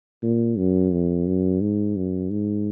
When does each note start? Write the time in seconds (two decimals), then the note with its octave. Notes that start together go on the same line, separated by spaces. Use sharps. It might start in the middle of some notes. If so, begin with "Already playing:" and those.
0.23 A#2
0.58 F#2
0.92 F2
1.27 F#2
1.61 G#2
1.96 F#2
2.30 G#2